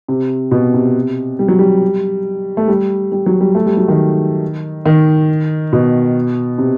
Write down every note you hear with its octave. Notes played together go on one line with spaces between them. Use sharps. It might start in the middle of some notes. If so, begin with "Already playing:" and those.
C3
B2
C3
G3
F#3
G3
A3
G3
G3
F#3
G3
A3
G3
F#3
D#3
D#3
B2
C3